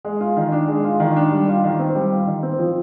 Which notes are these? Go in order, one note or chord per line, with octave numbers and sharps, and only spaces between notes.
G#3
F4
D#3
D4
G#3
F4
D#3
D4
G3
F4
D#3
C4
G3
F4
D#3
C4
F3